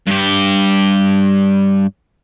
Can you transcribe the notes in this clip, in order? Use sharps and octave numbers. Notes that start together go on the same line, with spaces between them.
G2 G4